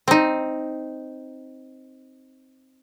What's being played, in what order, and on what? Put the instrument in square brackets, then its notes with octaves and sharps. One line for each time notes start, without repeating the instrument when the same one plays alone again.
[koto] C4 D#4